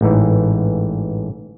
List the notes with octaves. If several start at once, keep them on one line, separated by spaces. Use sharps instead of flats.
A1 G#2 E3